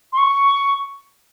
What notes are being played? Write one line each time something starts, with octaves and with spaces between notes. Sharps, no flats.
C6
C#6